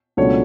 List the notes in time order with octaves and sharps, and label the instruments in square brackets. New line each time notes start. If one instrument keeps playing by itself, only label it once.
[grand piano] C#2 B2 F#3 A3 D4 C#5